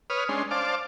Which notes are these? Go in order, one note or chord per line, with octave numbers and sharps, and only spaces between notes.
B4 C#5 D#6 F6
G#3 C#4 D4 C6
C5 D5 F5 A5 D6